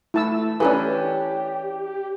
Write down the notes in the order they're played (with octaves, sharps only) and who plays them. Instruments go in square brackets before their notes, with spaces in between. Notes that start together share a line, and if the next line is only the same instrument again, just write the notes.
[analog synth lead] A3 [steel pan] E4 A5 E6
[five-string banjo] E3 C#4 D4 [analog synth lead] G4 [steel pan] A4 B4